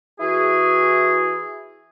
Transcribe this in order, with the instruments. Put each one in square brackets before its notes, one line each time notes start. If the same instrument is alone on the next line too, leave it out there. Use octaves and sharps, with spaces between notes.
[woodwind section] E3 E4 F#4 G#4